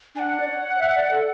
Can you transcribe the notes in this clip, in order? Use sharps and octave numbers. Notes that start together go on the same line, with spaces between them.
D4 F#5 G#5
D5
C#5
E5
D5
A4